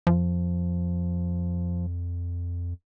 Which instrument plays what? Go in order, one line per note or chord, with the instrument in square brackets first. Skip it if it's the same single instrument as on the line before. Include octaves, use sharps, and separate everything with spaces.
[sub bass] F2 [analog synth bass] F3